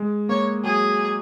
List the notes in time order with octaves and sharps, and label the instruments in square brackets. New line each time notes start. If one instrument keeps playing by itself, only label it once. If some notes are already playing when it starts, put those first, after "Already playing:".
Already playing: [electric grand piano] G#3
[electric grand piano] A#3 [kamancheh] C#5
[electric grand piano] F#3 [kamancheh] G#4